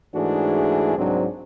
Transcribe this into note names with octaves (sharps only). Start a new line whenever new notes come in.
G#2 E3 A3 D4 F#4 G#4
C2 G#2 F#3 C4 D4